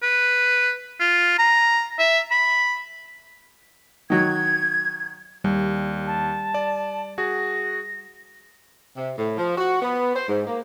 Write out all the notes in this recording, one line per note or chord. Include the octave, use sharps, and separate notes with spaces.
B4
F4
A#5
E5
B5
D#3 F#3 G#6
D#2 G3
A5
D5
F#4 G#4 A#6
C3
A2
F3
F#4
B3
C5
G#2
A#3